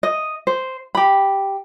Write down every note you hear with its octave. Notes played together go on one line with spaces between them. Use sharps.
D#5
C5
G4 B5